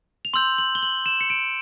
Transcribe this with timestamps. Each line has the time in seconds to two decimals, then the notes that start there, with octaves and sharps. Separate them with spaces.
0.25 F7
0.34 C6 E6 G6 F#7
0.58 F#7
0.75 G7
0.83 F#7
1.06 E7
1.21 C#7
1.30 D7